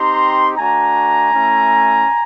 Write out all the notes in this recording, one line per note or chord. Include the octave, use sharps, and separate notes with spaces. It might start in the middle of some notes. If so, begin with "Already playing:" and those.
Already playing: C4 D#4 G4 A#5 C6
A3 D4 F#4 G#5 A#5
A3 C#4 E4